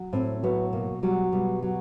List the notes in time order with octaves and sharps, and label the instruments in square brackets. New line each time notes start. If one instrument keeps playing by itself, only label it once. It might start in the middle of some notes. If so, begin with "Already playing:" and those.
Already playing: [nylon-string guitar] F#3
A2 C4
F#3 B3
B2 A#3
F#3 G3
B2 G3
F#3